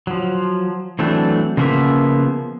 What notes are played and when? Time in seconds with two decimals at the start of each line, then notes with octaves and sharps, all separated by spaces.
0.07 F3 F#3
0.99 E3 F#3 A3 C4 D4
1.57 C#3 F3 A#3 B3 E5